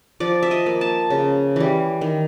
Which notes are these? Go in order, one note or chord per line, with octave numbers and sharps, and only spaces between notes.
F3 D5
E5
D#5
A#3
A5
C#3
E3 G3
D#3